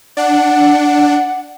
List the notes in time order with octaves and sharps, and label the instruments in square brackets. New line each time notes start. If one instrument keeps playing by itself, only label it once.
[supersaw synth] D4 [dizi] F#5